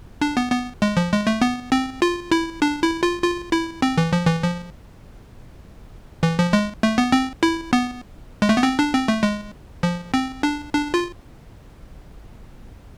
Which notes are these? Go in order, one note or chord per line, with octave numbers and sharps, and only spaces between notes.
D4
B3
B3
G#3
F3
G#3
A3
B3
C4
F4
E4
D4
E4
F4
F4
E4
C4
E3
F3
E3
F3
E3
F3
G#3
A3
B3
C4
E4
B3
G#3
A3
B3
C4
D4
C4
A3
G#3
F3
C4
D4
D4
F4